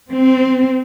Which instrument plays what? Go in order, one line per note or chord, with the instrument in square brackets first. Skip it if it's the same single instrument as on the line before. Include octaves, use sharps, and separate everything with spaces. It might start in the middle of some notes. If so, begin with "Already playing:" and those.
[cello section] C4